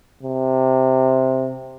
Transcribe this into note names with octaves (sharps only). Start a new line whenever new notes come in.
C3